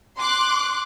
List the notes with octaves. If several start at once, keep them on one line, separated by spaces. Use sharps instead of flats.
C6 D6 F#6